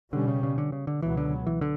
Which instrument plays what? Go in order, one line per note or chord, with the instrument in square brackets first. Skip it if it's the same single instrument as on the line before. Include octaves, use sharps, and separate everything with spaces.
[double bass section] B2 G3 C#4 [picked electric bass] D3
[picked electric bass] C#3
C#3
D3
C#3
D3
[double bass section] C#2 B2 F#3 B3 [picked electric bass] E3
[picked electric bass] D3
E3
D3